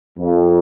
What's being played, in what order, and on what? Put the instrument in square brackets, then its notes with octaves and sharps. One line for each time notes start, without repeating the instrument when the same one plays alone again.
[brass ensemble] F2